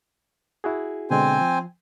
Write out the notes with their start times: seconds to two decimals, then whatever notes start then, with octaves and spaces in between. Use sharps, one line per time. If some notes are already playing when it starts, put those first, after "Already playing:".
0.64 E4 F#4 G#4
1.11 B2 D3 G#3 C4 C5 G#5
1.41 F3